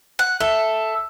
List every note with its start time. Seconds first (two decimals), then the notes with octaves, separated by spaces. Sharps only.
0.19 F#5
0.40 A4 E5